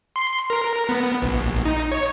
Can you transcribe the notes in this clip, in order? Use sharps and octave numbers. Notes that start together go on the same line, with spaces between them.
C6
A#4
B3
A#1
D#4
C#5